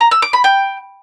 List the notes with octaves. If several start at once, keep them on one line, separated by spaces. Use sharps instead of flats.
A#5
E6
D6
B5
G5